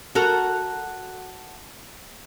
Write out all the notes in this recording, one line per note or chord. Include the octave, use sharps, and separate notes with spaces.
F#4 A4 A#4